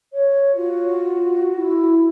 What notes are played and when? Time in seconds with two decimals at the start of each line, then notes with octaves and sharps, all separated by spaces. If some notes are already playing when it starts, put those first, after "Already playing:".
0.13 C#5
0.55 F4 F#4
1.56 E4